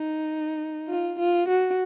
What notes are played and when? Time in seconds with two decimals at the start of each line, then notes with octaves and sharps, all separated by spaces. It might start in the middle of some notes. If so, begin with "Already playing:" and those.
Already playing: D#4
0.88 F4
1.19 F4
1.49 F#4